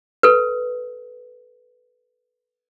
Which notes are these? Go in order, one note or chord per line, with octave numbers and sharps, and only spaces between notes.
A4 B4